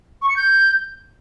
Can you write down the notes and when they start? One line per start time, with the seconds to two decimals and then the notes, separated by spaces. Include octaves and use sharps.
0.22 C#6
0.29 C#7
0.36 G6